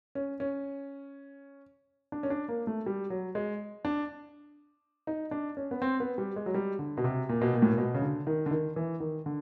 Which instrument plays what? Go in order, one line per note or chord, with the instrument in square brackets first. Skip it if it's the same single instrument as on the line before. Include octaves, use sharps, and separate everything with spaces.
[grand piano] C#4
C#4
D4
C#4
D4
A#3
A3
G3
F#3
G#3
D4
D#4
D4
C#4
B3
C4
B3
G3
G#3
F#3
G3
D3
B2
C3
A#2
B2
A#2
A2
A#2
B2
C#3
D3
D#3
D3
D#3
E3
D#3
D3